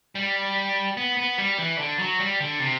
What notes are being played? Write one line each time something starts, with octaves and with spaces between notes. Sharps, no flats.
G3
B3
B3
G3
E3
D3
F#3
G3
D3
C3